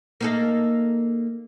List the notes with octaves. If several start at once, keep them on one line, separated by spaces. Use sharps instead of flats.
A#3 D#4 A4